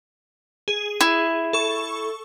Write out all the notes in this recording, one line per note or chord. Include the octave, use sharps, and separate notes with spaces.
G#4
E4
A4 C#6